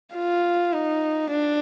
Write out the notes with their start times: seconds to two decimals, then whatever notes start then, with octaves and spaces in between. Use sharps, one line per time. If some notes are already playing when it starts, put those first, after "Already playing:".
0.15 F4
0.73 D#4
1.31 D4